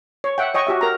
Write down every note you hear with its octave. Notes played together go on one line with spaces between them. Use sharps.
C#5
E5 F#5 G5
C#5 D#5 G5 C#6
F#4 G4 E5
A#4 A#5